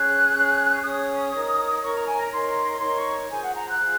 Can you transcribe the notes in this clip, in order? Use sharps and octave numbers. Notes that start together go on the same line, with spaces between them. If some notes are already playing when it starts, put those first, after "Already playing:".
Already playing: C#4 G#4 C#5 F#6
C#4 G#4 C#5
C#4 G#4 C#5 D#6
D#4 A#4 C#5
D#4 A#4 C#5 C#6
A#5
G#5
A#5
D#4 A#4 C#5 C6
D#4 A#4 C#5 C6
C#6
F4 G#4 C5 G#5
F#5
A#5
F#6
F4 G#4 C5